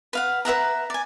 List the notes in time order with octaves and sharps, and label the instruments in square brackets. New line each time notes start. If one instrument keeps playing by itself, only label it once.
[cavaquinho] B4 F5 F#5
B4 E5 F#5 A#5
D5 G#5